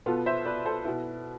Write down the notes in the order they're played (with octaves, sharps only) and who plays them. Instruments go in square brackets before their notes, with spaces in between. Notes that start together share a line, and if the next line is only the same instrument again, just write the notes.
[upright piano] B2 B3 F4 A4
C5 E5
B4 D5
A4 C5
B2 B3 E4